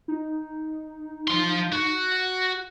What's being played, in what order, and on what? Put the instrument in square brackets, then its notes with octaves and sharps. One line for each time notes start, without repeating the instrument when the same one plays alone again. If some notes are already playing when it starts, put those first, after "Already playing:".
[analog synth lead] D#4
[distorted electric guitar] F3 C6
F#4